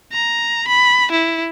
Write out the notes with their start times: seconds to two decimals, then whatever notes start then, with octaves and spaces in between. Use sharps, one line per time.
0.13 A#5
0.68 B5
1.11 E4